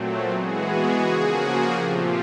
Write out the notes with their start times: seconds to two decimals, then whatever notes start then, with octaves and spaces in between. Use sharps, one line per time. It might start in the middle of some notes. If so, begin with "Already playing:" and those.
Already playing: A#2 F#3 A3 C4
0.31 E3 G#3 B3 F#4 G#4
0.67 F#4 G#4
1.03 C#3 F3 A#3 F#4 G#4
1.73 A#2 F3 A3 C4 F4 G4